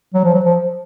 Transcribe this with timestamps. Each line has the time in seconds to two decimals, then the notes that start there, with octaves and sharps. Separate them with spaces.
0.14 F#3
0.24 F3
0.34 F#3
0.45 F3